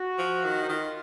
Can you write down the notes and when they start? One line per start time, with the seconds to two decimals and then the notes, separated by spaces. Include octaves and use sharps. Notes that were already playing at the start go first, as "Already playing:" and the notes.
Already playing: F#4
0.19 F3
0.44 D#3
0.62 D#4
0.69 D#3 F4